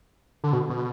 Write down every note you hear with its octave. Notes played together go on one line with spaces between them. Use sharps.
D3
B2
B2